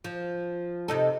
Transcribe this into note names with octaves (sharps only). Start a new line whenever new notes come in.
F3
C3 D#4 A4